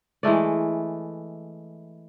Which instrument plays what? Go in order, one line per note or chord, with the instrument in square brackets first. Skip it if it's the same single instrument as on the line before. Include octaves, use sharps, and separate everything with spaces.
[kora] E3 G#3 A3 D5